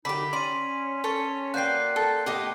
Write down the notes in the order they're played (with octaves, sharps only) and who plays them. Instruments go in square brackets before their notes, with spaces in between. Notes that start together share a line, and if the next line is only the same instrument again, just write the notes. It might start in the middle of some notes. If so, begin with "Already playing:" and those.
[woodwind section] F#2 D#4 [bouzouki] D3 G4 [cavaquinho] B5 D6 [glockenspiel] B6
[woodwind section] C#4 [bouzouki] D5 A#5 [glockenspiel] C6 D#7
[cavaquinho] A4 C#5
[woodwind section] A#3 D5 [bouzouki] F#4 B4 G5 [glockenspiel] F#6 G6 C7
[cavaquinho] A4
[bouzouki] A2 B3 [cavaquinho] G4 D#5 D6